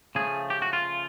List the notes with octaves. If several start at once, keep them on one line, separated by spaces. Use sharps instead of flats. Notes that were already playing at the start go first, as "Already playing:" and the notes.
C#3 F3 A3 G#4
G4
F#4
F4